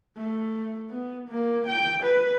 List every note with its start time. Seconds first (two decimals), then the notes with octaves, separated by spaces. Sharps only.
0.17 A3
0.90 B3
1.29 A#3
1.67 G5
2.04 B4